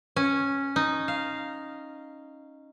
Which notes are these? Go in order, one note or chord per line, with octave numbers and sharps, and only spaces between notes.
C#4
D#4
F5